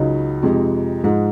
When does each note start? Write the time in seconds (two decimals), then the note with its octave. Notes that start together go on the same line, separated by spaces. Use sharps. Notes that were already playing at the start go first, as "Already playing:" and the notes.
Already playing: C#2 C#3 F#3 D#4
0.43 F2 C3 F3 G#3
1.04 G#2 F3 G#3